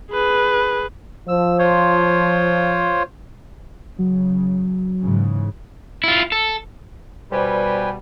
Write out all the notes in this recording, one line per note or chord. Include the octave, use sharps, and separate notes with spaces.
G#4 B4
F3 E6
F4 C5 C#5
C#3 F#3
G#2 C#3 E3
E4 F4
A4
B2 G3 B4 C5 D5 G5 G#5 B5